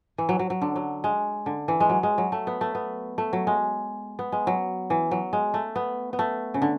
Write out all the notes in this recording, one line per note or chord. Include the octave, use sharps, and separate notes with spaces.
E3
F#3
F#3
F#3
D3
F#3
G#3
D3
E3
G#3
F#3
G#3
F#3
A3
B3
A3
B3
A3
F#3
G#3
B3
G#3
F#3
E3
F#3
G#3
A3
B3
B3
A3
C#3
D3